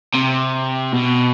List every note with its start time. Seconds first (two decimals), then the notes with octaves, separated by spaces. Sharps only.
0.15 C3
0.93 B2